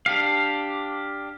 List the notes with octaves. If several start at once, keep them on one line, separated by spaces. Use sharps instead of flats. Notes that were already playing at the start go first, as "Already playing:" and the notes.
D4 G4 F5